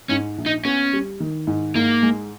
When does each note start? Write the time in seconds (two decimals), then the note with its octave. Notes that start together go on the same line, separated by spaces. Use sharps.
0.09 G#2 C#4
0.38 A#1
0.46 D#4
0.65 B3 C#4
0.93 G3
1.20 D#3
1.47 G#2
1.75 G#2 A#3
2.02 G#3